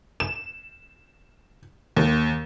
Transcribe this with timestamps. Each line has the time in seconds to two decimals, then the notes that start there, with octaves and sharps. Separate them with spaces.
0.20 E7
1.97 D#2